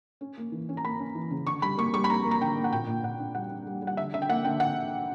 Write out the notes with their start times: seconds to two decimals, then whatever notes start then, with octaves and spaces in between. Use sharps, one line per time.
0.21 C#4
0.38 A#3
0.52 E3
0.69 C#4
0.77 A#5
0.84 A#3 B5
0.99 C#4
1.15 E3
1.31 C#3
1.47 D3 C#6
1.62 G3 B5
1.77 A#3 C#6
1.94 G3 C#6
2.04 B5
2.09 A#3 A#5
2.25 A#3
2.31 A#5
2.41 D3 G5
2.57 A#3
2.64 F#5
2.72 A#2 G5
2.87 A#2
3.03 A#2 F#5
3.20 D4
3.35 G3 F#5
3.50 D4
3.67 G3
3.82 G3
3.87 F#5
3.97 D3 E5
4.13 D3 E5
4.22 G5
4.29 A#3 F#5
4.45 D3 G5
4.60 D3 F#5